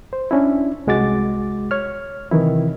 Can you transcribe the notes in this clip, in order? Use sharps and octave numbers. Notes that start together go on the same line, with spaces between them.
C5
C#4 D4 E4
C2 G#3 F#4 D6 A6
C#5 F6
C3 D#3 E3 E4